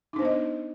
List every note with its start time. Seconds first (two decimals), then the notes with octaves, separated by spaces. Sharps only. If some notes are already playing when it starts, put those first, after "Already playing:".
0.13 D#4
0.16 D4
0.19 C5
0.22 B3
0.25 D#5